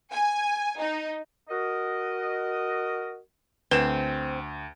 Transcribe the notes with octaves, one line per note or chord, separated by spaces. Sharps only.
G#5
D#4
F#4 A#4 D#5
D2 C4 B4 E7